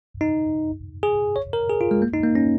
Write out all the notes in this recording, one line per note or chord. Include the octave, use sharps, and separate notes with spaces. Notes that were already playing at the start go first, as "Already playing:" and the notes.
D#4
G#4
C#5
A#4
G#4
F4
G#3
A#3
D#4
A#3
C#4